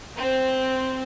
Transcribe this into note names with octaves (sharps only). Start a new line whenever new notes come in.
C4